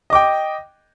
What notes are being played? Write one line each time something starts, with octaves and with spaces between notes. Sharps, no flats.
D#5 G5 D6